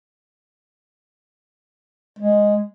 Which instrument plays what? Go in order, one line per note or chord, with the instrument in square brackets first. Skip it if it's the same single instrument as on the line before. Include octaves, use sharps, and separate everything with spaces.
[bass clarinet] G#3